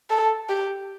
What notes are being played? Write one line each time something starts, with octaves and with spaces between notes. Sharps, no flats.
A4
G4